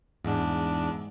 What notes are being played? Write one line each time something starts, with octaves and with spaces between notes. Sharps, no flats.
E2 G#2 D4